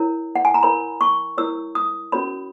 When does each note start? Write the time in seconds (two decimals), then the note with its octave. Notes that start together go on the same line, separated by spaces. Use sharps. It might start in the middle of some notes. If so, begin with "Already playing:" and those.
Already playing: E4 A#4 C#5
0.36 F#5
0.45 G#5
0.54 A#5
0.63 E4 A#4 C#5 B5
1.01 C#6
1.38 E4 A#4 C#5 E6
1.75 D#6
2.12 C#4 F#4 A#4 C#5 B5